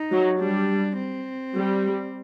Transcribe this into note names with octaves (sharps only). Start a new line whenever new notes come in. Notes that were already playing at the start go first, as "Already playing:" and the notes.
Already playing: D#4
F#3
G3 D4
C4
G3